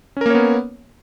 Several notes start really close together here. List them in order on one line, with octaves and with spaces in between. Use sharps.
C#4 A#4 A#3 C#5 B3